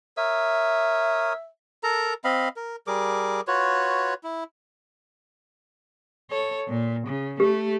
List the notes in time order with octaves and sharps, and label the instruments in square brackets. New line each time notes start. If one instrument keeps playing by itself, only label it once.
[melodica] A#4 C#5 D#6 [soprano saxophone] E5
[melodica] A4 A#4 A#5
C4 D#5 F5 B5
A#4
G3 G#4 A#4 D6
F4 F#4 B4 C#5
E4
[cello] A4 C#5
A#2
C#3
[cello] A3 [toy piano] G4